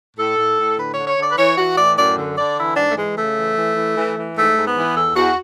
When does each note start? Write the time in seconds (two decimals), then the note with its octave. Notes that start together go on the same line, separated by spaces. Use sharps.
0.17 A2 A4
0.37 A2
0.57 A2
0.77 D3 B4
0.92 D3 C#5
1.07 C#5
1.17 D3 D5
1.31 B4
1.36 E3 C#5
1.56 E3 F#4
1.76 A2 D5
1.96 F#2 D5
2.16 D3
2.36 D3 D5
2.56 E3 E4
2.76 G#2 D4
2.90 A3
2.96 E3 G#3
3.16 C#3 A3
3.36 E3
3.56 E3
3.75 E3
3.96 E3
4.16 E3
4.35 G#2 A3
4.56 G#2
4.65 B3
4.76 E3
4.95 E2 A4
5.14 E2 F#4